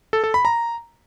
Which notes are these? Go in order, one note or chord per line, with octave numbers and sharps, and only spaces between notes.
A4
A4
B5
A#5